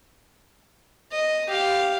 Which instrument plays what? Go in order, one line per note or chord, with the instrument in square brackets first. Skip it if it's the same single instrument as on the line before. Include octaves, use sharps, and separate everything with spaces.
[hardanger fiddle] D#5
G4 F5